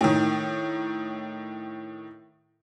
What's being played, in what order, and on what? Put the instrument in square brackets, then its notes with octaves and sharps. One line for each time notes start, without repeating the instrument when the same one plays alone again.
[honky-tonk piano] A2 D#3